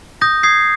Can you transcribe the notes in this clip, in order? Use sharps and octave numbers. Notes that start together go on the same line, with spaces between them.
D#6 G6 A#6
D#6 G#6 C7